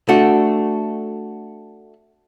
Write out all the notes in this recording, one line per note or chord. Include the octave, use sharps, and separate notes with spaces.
A3 D4 F#4